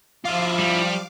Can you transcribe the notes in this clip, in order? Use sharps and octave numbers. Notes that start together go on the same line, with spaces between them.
F3 E4 F4 F5 D6
G3